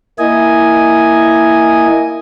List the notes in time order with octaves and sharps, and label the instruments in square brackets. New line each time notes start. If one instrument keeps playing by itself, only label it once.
[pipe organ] A#3 E4 D#5 G#5